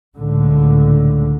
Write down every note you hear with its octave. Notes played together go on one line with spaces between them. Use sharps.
C#2 A2 D3